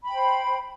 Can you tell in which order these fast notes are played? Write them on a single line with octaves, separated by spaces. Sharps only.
B5 G5 C5